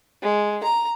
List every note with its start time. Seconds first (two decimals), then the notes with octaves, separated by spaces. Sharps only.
0.22 G#3
0.63 A#5